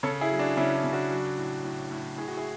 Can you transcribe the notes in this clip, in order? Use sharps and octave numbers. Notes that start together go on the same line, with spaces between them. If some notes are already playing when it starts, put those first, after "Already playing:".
C#3 A4 C#5
E4 G#4
F#3
D4 F#4
C#3 C#4 E4
D4
C#3
D4 F#4
F#3
A2
A2
A2
A2 G#4
F#4
E4 G#4